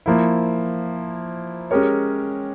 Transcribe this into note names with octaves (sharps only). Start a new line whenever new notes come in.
F3 A#3 E4
G#3 C#4 G4 A#4 C#5